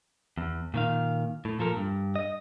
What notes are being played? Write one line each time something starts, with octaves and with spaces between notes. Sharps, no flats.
E2
A#2 D#3 F5
A2
A#2 F3 A4 A#4
G2
D#5